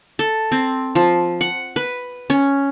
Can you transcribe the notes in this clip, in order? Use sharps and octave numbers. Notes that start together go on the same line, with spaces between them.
A4
C4
F3
F#5
B4
C#4